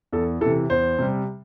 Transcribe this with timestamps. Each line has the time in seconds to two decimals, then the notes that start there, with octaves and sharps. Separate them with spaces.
0.12 E2 A4
0.41 E3 A4
0.46 C3
0.70 E2 C5
0.99 C3 G3